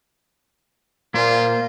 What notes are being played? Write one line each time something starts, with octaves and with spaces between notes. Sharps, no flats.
A#2 A#3 F4 C5